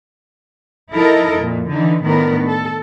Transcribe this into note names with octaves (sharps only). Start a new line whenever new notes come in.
F3 D#4 E4 A4 A#4 D#5
F2 A#2
D3 E3 D#4
A2 D#3 B3 D4 A#4
A4